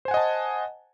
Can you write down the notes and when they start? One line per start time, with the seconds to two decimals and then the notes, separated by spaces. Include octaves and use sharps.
0.05 C5
0.08 G#5
0.11 F#5
0.14 D#5
0.17 A5